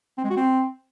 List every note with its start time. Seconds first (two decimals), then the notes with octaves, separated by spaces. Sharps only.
0.18 C4
0.24 G#3
0.30 F#4
0.36 C4